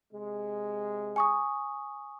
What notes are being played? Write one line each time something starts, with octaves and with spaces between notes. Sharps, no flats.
C3 G#3
G#5 C#6 D#6